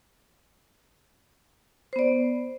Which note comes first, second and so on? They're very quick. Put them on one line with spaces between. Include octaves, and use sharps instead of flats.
C5 B3 D5